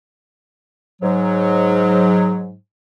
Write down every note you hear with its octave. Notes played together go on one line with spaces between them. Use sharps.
G#2 F#3